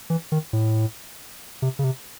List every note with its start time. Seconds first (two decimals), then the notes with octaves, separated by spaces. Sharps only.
0.10 E3
0.32 D#3
0.53 A2
1.62 C3
1.79 C#3
1.84 C3